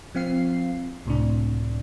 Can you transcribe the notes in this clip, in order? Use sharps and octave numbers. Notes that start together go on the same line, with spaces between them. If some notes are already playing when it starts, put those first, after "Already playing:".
F3 C4 F5 C7
C#2 A2 C3 D4